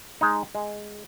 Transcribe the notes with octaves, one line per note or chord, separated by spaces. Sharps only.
G#3 D#4
G#3